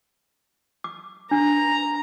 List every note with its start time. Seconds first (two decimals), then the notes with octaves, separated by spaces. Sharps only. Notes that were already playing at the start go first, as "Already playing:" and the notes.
0.84 D6
1.31 D4 A#5